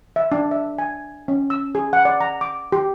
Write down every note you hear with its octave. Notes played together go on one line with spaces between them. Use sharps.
E5
D4
E5
G#5
C#4
E6
G#4
F#5
D5
A#5
D6
G4